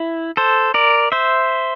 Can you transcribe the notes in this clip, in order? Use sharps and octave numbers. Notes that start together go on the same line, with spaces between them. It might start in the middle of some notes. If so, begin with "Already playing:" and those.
Already playing: E4
A4 C5
A#4 D5
C5 E5